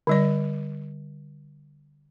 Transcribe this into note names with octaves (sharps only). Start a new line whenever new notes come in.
D3 G3 D5